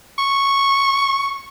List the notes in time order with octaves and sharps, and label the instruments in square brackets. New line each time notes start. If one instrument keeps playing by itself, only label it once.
[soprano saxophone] C#6